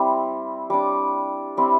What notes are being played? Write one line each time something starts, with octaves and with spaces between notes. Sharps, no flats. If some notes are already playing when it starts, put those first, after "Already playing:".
Already playing: G3 C4 E4
G3 D4 D6
G3 C4 E4